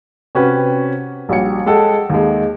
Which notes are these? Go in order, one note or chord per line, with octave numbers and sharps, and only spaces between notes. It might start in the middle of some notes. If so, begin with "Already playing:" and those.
C3 C#4 F#4 G4 B4
A#1 G3 F#4 C#5 C#7
G#3 G4 A4 F#5
D#2 G#3